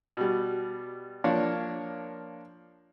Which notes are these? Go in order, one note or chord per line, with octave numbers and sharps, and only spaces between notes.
B2 G3
F3 A#3 D4 C#5